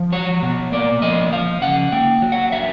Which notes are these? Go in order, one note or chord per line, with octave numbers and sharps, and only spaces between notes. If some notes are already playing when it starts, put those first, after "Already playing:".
Already playing: F3
F#3 C#5
B2
A#3 D5
F3 D#5
F3 F5
C#3 F#5
A#3 G5
F#3
F#5
F#3 E5